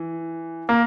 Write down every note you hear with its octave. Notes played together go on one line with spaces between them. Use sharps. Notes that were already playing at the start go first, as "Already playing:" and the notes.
Already playing: E3
A#3